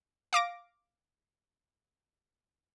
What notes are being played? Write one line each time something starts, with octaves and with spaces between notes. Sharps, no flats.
F5 D6 A#6 D7